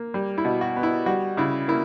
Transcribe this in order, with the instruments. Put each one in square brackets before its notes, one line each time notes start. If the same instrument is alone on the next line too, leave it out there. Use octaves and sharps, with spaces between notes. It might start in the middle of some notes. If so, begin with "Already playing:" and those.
Already playing: [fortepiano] A#3
G3
E4
B2
F#4
B3
E4
G3 F#4
C#3 E4
A#3 E4